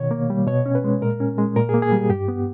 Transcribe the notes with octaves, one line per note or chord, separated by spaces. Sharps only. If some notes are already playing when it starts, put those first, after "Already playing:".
Already playing: B2 D#3 C#5
A#3
G3
B2 C#5
C#4
B4
G#3
A#2 A#4
C#4
G#3
A#2 A#4
G#4
A#3
G#4
G3 G4
G2 G4
B3